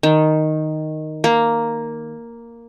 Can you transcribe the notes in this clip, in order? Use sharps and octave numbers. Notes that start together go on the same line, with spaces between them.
D#3
A#3